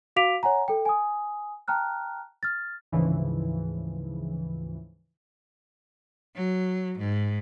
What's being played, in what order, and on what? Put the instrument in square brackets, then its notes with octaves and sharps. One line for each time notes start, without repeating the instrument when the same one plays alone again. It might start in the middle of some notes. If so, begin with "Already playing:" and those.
[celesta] F#4 F5 D6 B6 D7 F7
C#5 F#5 G#5 A#5
A4 G5
G#5 D#6
G5 A5 A#5 F6 F#6
F6 A6
[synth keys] D2 G#2 C#3 E3 F3
[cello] F#3
G#2